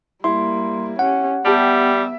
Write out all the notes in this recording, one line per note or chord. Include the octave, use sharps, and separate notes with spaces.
G3 A#3 E4 C6
C#4 G4 F#5
G3 B3 G4 E5 A5 D7